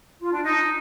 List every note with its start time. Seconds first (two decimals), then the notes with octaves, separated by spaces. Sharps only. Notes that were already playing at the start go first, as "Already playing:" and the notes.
0.21 F4
0.32 D4
0.43 D#4